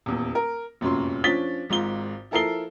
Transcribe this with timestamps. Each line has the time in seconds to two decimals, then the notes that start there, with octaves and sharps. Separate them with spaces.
0.06 D#1 E2
0.35 A#4
0.81 F1 F#2 A#2 C#4 C6
1.24 F3 C#4 D4 A6 B6 G7
1.70 G#1 G#2 F4 G7
2.31 F3 E4 A4 A#4 C7 G7